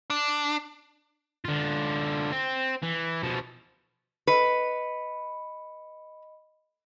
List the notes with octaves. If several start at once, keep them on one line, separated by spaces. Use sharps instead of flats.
D4
D3 F4
C4
E3
B2 F3
B4 D#5 B5 C#7